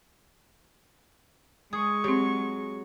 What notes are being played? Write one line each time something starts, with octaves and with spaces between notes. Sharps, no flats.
G#3 G#4 C#6
F#3 C4 G4